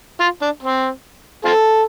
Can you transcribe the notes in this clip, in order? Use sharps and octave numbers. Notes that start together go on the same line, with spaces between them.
F4
D4
C4
C4 F4 A4